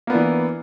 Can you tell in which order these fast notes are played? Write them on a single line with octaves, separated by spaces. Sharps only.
A#3 B3 D4 E3